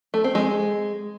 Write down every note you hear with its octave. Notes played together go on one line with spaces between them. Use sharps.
A3
C4
G#3